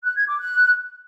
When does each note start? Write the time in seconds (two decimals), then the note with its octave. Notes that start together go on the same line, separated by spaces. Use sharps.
0.04 F#6
0.16 G#6
0.28 D6
0.40 F#6